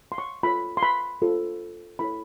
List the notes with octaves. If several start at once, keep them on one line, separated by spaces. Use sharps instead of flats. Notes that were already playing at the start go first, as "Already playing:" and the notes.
C6
C#6
F4 A4 C#5 B5
C6
B5
F4 A4 C5
E4 A4 C#5 B5